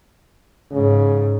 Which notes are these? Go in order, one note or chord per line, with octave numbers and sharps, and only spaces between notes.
G#2 C#3